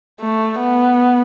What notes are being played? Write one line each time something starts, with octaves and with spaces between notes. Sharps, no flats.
A3
B3